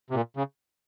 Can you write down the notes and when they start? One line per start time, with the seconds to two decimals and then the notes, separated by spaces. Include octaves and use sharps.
0.10 C3
0.15 A#2
0.37 C#3